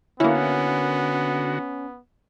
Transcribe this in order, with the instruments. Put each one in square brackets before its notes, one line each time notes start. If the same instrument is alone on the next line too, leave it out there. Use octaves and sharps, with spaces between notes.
[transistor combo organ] D3 F#4 [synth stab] A#3 E4 [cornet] B3 [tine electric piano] C#4